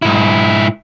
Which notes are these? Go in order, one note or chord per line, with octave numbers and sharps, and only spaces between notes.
G#2 E4